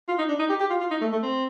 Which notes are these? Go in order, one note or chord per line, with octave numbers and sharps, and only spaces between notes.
F4
D#4
D4
D#4
G4
G4
F4
F4
D#4
A3
A3
C4